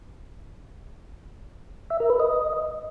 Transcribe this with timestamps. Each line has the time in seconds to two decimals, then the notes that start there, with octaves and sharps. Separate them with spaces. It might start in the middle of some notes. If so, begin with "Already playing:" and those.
1.90 E5
2.00 A#4
2.10 B4
2.20 D#5